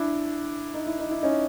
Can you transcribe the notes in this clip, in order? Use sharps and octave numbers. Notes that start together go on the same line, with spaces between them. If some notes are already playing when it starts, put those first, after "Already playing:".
Already playing: D4 E4
D#4
E4
D#4
E4
C#4 D#4